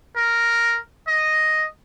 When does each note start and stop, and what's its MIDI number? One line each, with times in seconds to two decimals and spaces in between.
0.16 0.78 70
1.08 1.65 75